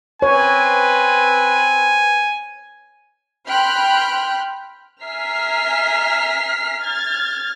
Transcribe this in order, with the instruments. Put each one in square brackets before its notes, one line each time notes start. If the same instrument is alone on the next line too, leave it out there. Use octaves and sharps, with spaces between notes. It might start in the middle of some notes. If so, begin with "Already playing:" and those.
[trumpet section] C4 B4 [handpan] C#5 [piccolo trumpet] G#5
[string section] G5 B5 C6 F6 F#6
[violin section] E5 G#5 A#5 F6 B6 C7
F6 G#6 A6